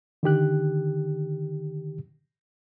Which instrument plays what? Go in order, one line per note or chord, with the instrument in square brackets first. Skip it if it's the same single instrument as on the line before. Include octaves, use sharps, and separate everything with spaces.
[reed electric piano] D3 D#3 G4 F#6